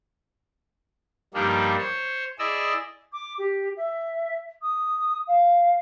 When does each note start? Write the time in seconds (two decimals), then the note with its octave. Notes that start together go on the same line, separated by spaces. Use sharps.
1.34 G2 F3 G3 A#3 D4 D#4
1.78 C5 C#5
2.39 E4 G#4 D5 D#5 E6
3.12 D6
3.38 G4
3.76 E5
4.62 D#6
5.27 F5